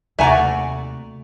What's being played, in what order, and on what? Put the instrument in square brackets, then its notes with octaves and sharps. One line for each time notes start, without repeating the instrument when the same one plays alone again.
[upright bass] D#2 C3 [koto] A3 F#4 D5 [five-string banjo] E5 G#5 A#5